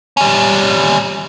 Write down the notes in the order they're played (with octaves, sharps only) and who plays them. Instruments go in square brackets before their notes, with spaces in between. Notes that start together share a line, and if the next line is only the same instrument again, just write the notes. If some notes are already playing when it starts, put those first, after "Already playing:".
[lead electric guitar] G3 C#4